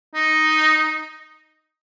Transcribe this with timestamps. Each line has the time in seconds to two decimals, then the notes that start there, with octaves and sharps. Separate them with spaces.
0.15 D#4